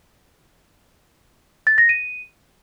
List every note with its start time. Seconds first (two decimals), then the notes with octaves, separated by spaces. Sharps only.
1.67 A6
1.78 A#6
1.89 D#7